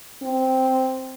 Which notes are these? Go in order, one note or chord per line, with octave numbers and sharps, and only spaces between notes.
C4